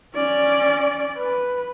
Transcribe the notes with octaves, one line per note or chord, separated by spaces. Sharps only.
C#4 D5
B4